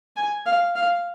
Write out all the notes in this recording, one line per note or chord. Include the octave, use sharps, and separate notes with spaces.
G#5
F5
F5